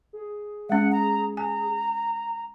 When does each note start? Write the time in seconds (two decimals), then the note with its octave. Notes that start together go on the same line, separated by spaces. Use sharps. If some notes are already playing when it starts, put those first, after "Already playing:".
0.13 G#4
0.70 G#3 C#4 F#5
0.92 A#5
1.37 G#5 A#5